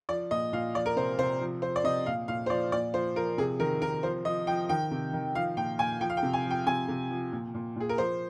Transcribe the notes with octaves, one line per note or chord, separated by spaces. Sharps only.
F3 D5
A#2 D#5
A#2 F5
F3 D5
A#4
C3 C5
C3 C5
F3
F3 C5
D5
C3 D#5
A#2 F5
A#2 F5
C5
F3 D5
A#2 D5
F3 C5
F3 A#4
C3 G#4
D#3 A#4
C3 A#4
F3 C5
F3 D#5
F3 G5
D#3 G5
C3
D#3
F3 F5
A#2 G5
A#2 G#5
F3 G5
F5
G5
C3
G#5
F3
G5
C3 G#5
C3
F3
A#2
A#2
A#2 G#4
A#4
F3 C5